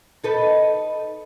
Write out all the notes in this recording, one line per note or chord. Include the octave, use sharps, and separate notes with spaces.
D#4 A4 B4